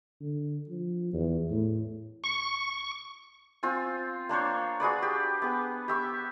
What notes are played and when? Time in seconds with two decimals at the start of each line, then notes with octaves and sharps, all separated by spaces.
0.21 D3
0.69 F3
1.13 E2
1.50 A2
2.24 C#6
3.63 C4 F4 G#5
4.29 A#3 D4 C5 C#5
4.80 F#4 G#4 B4 D5
5.02 G4
5.42 B3 G#4
5.88 G4 E5 C#6